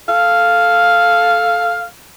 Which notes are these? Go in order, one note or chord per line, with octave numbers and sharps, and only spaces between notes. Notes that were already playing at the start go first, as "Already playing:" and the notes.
A4 F5